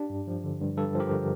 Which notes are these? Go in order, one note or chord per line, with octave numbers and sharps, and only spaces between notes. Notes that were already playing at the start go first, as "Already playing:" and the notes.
Already playing: D4 G4
G2
F3
D3
G2
G2 A4
F3 G4 A#4
D3